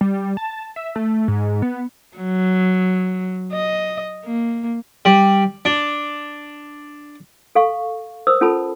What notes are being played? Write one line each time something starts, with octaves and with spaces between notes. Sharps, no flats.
G3
A5
E5
A3
G#2
B3
F#3
D#5
A#3
G3
D4
A4 F5 C#6
A#4 C5 D#6 E6
C#4 F4 A4 A5 B5